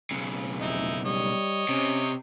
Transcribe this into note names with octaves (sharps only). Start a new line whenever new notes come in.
B1 C#3
F1 D#4 E4
G3 C#5 D#5
C3 C#4